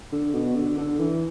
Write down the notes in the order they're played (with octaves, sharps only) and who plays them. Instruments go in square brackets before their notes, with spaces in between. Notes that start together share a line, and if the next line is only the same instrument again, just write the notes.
[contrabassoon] D3
B2
D3
D3
E3